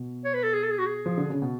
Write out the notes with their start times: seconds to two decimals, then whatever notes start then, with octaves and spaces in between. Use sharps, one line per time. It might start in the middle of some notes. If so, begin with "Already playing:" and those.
Already playing: B2
0.25 C#5
0.34 B4
0.43 A4
0.54 G#4
0.64 A4
0.71 G#4
0.79 F#4
0.86 G#4
1.06 F3
1.18 D3
1.30 C#3
1.42 B2